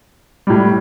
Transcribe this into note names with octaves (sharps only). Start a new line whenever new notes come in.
A2 G3